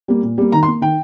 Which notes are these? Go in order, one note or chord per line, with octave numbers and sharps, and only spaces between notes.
G3 A#3
A#2
G3 A#3
D#3 A#5
C6
A#3
D#3 G5